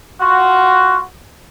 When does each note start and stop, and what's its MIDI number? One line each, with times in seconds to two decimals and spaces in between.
0.21 1.01 65
0.21 1.01 66